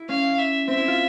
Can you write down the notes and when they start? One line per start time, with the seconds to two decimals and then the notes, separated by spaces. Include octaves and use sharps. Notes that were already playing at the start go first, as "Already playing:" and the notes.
Already playing: E4
0.09 C#4 F5
0.38 E5
0.67 C4 E5
0.77 E4
0.88 F4